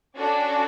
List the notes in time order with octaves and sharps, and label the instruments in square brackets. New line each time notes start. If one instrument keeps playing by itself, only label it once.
[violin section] C#4 D4 F#4 A4 D5